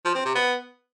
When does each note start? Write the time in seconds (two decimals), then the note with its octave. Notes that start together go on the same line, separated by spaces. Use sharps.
0.05 F3
0.15 C4
0.25 C3
0.35 B3